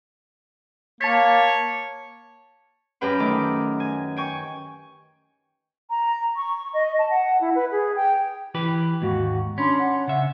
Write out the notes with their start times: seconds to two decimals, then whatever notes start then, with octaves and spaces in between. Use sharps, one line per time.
1.01 A#3 C#5 A5 A6 B6
3.01 F#2 G4 B4 G5 B5
3.20 D#3 A3 D6
3.80 G#5
4.17 G5 G#5 C#6
5.90 A#5
6.36 C#6
6.74 D#5
6.99 A5
7.11 F#5
7.41 E4
7.55 B4
7.71 G#4
7.96 G5
8.55 E3 G4 B4
9.02 D#2 G#2 F#4
9.58 C#4 D4 B5 C6
9.79 F#5
10.07 C#3 E5